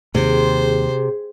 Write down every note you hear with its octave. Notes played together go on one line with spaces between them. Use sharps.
D#2 C3 G#4 C5